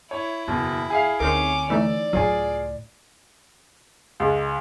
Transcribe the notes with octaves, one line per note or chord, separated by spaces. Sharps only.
E4 C#5
F#1 E2 B2
G#4 E5 F5
D2 C4 C#4 D#4 A#4 D6
E3 A3 D#4 D5 E6
C#2 A2 F#3 F4 G#4
C#2